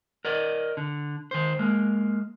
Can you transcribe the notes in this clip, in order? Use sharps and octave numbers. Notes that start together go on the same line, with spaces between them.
A#4 D5 D#5
D3
D#3 C5
G#3 A#3